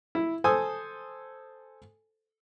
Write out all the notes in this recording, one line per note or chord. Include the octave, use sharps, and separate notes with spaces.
E4
A4 C5 G#5 D#6 E6